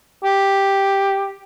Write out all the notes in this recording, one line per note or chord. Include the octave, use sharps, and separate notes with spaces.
G4